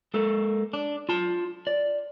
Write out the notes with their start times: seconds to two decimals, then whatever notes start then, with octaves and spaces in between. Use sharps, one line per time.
0.14 G#3 A#3 A4
0.73 D4
1.09 F4 A5
1.67 D5